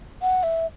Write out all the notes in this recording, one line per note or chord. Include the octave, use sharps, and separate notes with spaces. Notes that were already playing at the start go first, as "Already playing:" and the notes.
F#5
E5